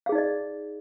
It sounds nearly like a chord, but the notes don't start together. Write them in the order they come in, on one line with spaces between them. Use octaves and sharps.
F5 G#4 D#4 D5 D#5